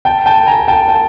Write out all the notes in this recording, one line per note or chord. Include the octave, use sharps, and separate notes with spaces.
G5 A5
G5 A5
G#5 A#5
G5 A5
G5 A5